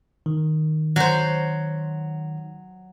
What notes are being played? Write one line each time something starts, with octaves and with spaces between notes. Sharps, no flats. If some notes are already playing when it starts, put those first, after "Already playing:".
D#3
F#3 C5